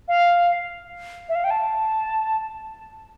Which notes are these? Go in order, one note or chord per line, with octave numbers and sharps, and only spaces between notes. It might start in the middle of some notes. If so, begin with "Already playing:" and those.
F5
E5
F5
G5
A5